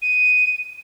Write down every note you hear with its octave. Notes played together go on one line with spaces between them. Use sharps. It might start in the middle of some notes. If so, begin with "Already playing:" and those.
D#7